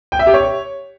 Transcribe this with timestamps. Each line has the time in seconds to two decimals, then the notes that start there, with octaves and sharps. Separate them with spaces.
0.12 G5
0.19 E5
0.27 G4
0.34 C#5